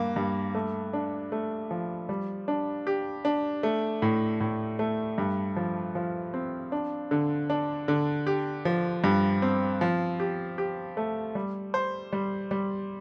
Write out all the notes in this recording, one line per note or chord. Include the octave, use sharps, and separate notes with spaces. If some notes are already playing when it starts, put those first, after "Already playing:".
Already playing: G2 A#3
G2
A3
D4
A3
F3
G3
D4
G4
D4
A3
A2
A2
A3
G2
F3
F3
C4
D4
D3
D4
D3
G4
F3
G2
C4
F3
G4
G4
A3
G3
C5
G3
G3